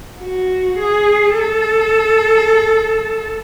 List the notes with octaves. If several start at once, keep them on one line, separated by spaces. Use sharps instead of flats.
F#4
G#4
A4